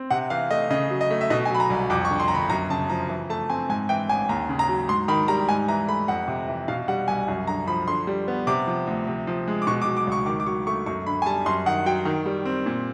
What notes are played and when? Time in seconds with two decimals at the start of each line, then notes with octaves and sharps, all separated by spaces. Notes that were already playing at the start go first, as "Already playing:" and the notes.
Already playing: C4
0.10 C3 F#5
0.30 E3 F5
0.50 A3 D#5
0.70 C#3 D#5
0.90 F#3
1.01 D#5
1.10 A3
1.21 E5
1.30 B2 D#5
1.45 G#5
1.50 F#3 B5
1.60 A#5
1.70 C2
1.90 F2 D6
2.05 C#6
2.10 D3
2.20 C6
2.28 G1 A#5
2.35 B5
2.50 F#2 A#5
2.70 C#3 A5
2.90 F3 A#5
3.09 E3
3.30 A3 A5
3.49 C4 G#5
3.69 G#2 G#5
3.89 E3 G5
4.09 A1 G#5
4.29 D#2 A#5
4.49 C#3
4.59 A#5
4.69 F#3
4.88 G#2 C6
5.08 D#3 B5
5.28 G3 A#5
5.49 G#2 G#5
5.68 E3 A#5
5.88 A3 B5
6.08 F2 F#5
6.28 C3
6.48 E3
6.68 B2 F5
6.88 G3 F#5
7.08 C2 G#5
7.28 F#2
7.47 D3 A#5
7.68 F3 B5
7.88 D3 C6
8.07 G3
8.28 B3
8.47 C3 D6
8.67 F3
8.87 D2
9.07 C3
9.27 F3
9.48 G#3
9.62 D6
9.67 B2 C#6
9.82 D6
9.86 F#3
9.97 D6
10.07 C#2 C#6
10.26 D#3 D6
10.40 D6
10.46 F#3 C#6
10.66 A3 C#6
10.86 F#2 C#6
11.06 D3 B5
11.22 G#5
11.26 G3 A5
11.46 F#2 C6
11.66 D#3 F#5
11.86 F#3 G5
12.05 D#3
12.26 G3
12.45 C4
12.66 A#2